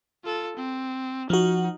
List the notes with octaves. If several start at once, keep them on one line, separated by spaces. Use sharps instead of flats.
F4 A4
C4
F3 D#4 F#4